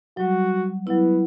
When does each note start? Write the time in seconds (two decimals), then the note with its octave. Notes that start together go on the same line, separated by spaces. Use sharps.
0.17 F#3 G3 F#4
0.87 F#3 B3 E4